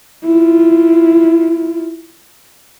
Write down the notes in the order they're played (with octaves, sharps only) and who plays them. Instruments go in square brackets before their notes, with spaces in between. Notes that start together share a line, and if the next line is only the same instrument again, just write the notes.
[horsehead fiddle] E4 F4